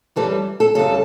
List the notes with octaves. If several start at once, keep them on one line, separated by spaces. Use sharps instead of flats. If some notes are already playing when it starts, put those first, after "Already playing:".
F#2 E3 G3 A4
A4
F#2 C#3 G3 A4